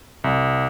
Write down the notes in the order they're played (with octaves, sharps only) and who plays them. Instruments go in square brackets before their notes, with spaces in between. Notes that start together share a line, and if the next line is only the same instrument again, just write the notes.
[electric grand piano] C2